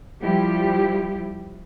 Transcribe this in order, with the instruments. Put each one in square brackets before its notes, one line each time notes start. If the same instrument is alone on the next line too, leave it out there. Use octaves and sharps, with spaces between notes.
[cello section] F3 G3 E4 G4